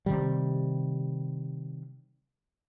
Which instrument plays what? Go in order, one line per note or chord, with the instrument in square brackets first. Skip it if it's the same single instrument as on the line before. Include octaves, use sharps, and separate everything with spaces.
[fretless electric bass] C3 D#3 G3